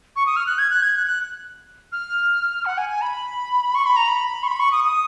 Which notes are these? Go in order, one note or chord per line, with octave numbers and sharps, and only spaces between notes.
C#6
D#6
F6
F#6
G#6
F#6
G#6
F#6
F#6
F6
F#5
G#5
G#5
B5
C#6
B5
A#5
B5
C#6
B5
C#6
D#6
D#6